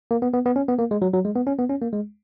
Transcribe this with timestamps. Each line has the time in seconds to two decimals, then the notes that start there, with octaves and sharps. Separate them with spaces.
0.11 A#3
0.22 B3
0.33 B3
0.46 B3
0.56 C#4
0.68 B3
0.79 A#3
0.91 G#3
1.02 F#3
1.14 F#3
1.25 G#3
1.35 B3
1.47 C#4
1.59 B3
1.69 C#4
1.82 A#3
1.93 G#3